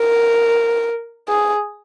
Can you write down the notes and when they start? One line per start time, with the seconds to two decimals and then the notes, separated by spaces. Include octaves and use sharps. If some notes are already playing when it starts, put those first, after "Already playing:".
Already playing: A#4
1.28 G#4